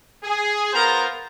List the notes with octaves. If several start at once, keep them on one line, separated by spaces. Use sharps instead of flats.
G#4
B3 F4 A#4 C5 A#5